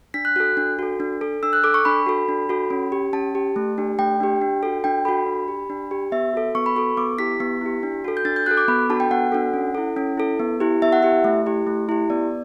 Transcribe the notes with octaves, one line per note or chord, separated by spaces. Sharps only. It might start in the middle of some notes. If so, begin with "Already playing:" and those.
D4 B6
F#6
F#4 A4 F#6
D4
F#4 A4
D4
A4
D4 E6
F#6
A4 D6
C#6
D4 B5
F#4 A4
D4
F#4 A4
C#4
G4
C#4 A5
G4
A3
D4 G4
A3 G5
D4 G4
D4
F#4 A4
D4 G5
F#4 A4 B5
D4
G4
D4
G4
B3 E5
F#4 A4
B3 C#6
B5
F#4 A4 C#6
B3 D6
E4 G4 B6
B3
E4 G4
D4
F#4 A4
G6
D4 A6
G6
F#4 A4 F#6
D6
B3 B5
D4 F#4 A4 A5
G5
B3 F#5
D4 F#4 A4
C#4
E4 A4
C#4
E4 A4
B3
E4 G4
B3 E5
F#5
E4 G4 E5
A3
E4 G4
A3
E4 G4
B3 D5